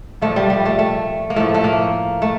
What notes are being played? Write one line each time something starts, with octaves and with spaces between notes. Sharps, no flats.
A#2 F3 A3
G3
G3
A3
A3
A#3
A2 F3 A3
A3
A#3
A3